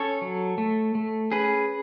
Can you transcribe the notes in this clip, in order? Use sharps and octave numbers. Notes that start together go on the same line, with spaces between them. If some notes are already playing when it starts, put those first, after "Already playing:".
Already playing: C#4 A4 C#5
F#3
A3
A3
C#4 G#4 B4